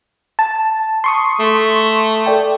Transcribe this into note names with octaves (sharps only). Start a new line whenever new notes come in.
A5
C6 C#6 D#6
A3
A4 D5 G5